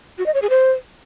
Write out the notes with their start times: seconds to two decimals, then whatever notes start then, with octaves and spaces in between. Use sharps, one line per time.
0.18 F#4
0.26 D#5
0.34 C#5
0.42 G#4
0.50 C5